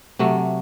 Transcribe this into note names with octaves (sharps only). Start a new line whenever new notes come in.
C3 F#3 A3